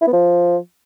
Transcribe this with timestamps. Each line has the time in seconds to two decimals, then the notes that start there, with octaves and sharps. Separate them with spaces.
0.01 E4
0.07 B3
0.13 F3